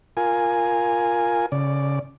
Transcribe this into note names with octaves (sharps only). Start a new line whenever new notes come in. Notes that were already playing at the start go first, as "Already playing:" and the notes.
F4 A#4 G#5
C#3 D5